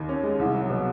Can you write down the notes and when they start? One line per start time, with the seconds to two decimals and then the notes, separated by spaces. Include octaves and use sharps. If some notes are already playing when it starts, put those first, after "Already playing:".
Already playing: D#2 D#3
0.09 C#4
0.23 G#3
0.39 C2
0.54 F#3
0.70 B2